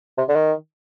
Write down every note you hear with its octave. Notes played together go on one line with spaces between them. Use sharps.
C3
D3
D#3